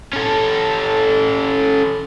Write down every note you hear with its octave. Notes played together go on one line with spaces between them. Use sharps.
C#4 A4